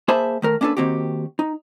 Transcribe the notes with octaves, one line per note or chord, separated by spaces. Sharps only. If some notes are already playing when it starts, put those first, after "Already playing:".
A#3 G#4 C5 E5 A5 B5
D#3 A3 A#4
A#3 C#4 D4 G#4 A4 B4
D#3 A#3 C4 F#4 G4
D#4